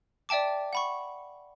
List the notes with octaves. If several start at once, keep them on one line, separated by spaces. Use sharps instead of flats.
D5 E5 G5 A5 D6
F#5 B5 C#6